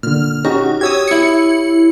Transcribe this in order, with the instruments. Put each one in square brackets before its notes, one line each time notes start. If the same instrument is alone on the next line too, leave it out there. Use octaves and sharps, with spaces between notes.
[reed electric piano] A#2 D3 [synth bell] F6
[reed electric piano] C#4 D#4 G4 [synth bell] F#4
[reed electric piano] G4 C#5 [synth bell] D#6 E6 G#6
[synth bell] E4 C#7